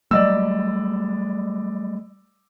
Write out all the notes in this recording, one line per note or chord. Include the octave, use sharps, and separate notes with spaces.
F#3 G3 A3 D5 D#5 E6